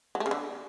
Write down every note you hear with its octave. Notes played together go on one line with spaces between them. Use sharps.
F#3
A3
C#3
D3